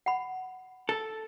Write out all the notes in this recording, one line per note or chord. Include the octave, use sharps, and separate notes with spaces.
F#5 B5
A4